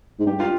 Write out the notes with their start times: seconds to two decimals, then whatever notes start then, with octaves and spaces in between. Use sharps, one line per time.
0.19 G#2
0.26 G2 G4
0.40 F4